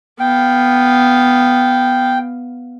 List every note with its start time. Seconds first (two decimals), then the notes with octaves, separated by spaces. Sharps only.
0.20 B3 F5 G5